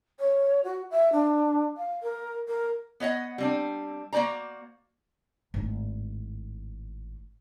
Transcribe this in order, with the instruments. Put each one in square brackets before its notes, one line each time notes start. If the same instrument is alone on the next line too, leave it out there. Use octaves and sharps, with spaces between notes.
[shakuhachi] C#5
F#4
E5
D4
F5
A#4
A#4
[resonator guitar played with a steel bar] B3 C#5 D#5 F#5
G3 C4 D4
A#3 F#4 C5 D5 A#5
[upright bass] G#1 A2